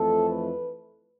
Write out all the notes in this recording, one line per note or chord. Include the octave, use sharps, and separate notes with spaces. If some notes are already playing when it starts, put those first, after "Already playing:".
Already playing: F2 E3 A3 A4
B4